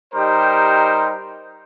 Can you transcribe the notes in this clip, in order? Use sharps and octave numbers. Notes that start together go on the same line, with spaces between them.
G3 D#4 G4 A#4 C5